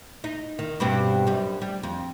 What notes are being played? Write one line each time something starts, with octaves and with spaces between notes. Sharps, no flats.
D#4
D#3
G2 B2 C4
F#2 G3
G3
F2